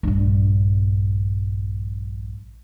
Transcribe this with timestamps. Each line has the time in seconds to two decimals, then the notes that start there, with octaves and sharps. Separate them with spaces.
0.03 A#1 G2